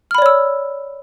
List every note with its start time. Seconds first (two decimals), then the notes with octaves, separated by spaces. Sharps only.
0.11 F6
0.15 B5
0.18 D5
0.22 C#5
0.26 E6